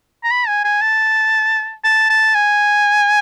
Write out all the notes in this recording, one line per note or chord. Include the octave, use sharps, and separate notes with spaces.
A#5
B5
G#5
G#5
A5
A5
A5
G#5